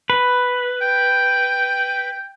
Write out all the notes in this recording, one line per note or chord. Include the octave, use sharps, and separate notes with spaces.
B4
G5